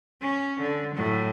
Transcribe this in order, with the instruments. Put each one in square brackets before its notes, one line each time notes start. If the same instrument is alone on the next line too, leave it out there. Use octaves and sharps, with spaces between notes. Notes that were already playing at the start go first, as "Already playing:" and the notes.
[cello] C#4
D3
A2 F#3